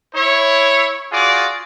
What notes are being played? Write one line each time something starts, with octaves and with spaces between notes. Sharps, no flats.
E4 C#5
F4 F#4 G#4 D5